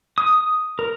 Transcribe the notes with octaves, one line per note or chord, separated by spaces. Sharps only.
D#6
A#4